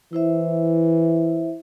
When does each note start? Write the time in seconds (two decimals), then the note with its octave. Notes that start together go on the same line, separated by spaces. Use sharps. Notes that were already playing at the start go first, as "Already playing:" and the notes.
0.13 E3 E4 C5 E5